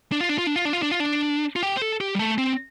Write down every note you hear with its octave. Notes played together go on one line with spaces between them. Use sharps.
D4
F4
D4
F4
D4
F4
D4
F4
D4
F4
D4
F4
G4
C5
A4
G4
G3
A3
C4